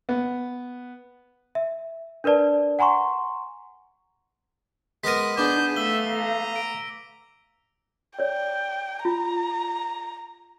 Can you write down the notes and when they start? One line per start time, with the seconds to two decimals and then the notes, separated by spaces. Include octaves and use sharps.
0.09 B3
1.55 E5
2.24 D4 A#4 B4 D5 A5
2.79 F#5 G#5 A#5 C6 C#6
5.04 G#3 B3 A#4 B6 D#7
5.37 B3 D4 G#4 D6 G6
5.76 A3 E5 F5 E6 G7
6.09 A#5
6.56 D7
8.19 C#5 D5 G5
9.05 F4 A#5